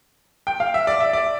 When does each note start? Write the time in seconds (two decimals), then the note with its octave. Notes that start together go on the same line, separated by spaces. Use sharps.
0.47 G5
0.60 F5
0.74 E5
0.87 D5
1.00 E5
1.13 D5